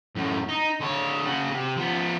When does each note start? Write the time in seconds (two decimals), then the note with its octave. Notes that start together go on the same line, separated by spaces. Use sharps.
0.16 F#2 A2
0.48 D#4
0.80 D3 C#5
1.24 C#3 F#4
1.51 C3
1.76 F3 B3